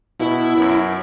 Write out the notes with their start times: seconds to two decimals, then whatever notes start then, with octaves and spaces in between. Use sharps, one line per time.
0.20 B2 E4
0.56 F#2